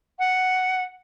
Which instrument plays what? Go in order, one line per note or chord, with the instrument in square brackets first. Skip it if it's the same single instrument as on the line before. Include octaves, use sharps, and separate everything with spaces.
[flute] F#5